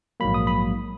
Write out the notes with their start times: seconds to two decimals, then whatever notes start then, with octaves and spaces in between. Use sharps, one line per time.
0.20 A#1 G#2 F#3 A#3 B5
0.34 D#6
0.47 B5